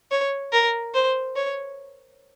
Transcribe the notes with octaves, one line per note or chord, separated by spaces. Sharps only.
C#5
A#4
C5
C#5